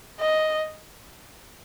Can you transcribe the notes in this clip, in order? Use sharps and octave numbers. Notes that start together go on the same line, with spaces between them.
D#5